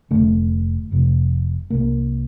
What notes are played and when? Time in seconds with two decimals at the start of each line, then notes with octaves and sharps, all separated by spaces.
0.11 F1 D#2 D3 A3
0.91 F1 F2 C3
1.70 C2 A#2 A#3